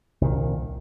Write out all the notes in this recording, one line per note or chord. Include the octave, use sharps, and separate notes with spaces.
C2 A#2 D#3